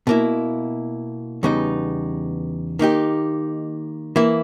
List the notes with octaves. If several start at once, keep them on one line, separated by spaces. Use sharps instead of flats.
B2 A#3 E4
E2 C#3 G3 B3 D#4
D#3 A#3 D#4 G4
E3 A#3 E4